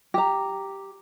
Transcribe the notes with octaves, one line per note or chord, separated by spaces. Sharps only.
G4 A#5